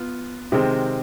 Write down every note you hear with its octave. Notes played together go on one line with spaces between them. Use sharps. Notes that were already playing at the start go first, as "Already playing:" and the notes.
Already playing: B3 F4
C3 D#3 G#3 C4